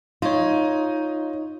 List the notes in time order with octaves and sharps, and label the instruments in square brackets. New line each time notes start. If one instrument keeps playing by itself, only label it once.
[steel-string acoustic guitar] D#4 [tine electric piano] F4 C#5